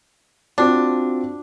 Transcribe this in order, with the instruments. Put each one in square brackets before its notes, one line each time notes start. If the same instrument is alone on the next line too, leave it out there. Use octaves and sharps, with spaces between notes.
[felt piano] C4 F4 F#4 [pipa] D4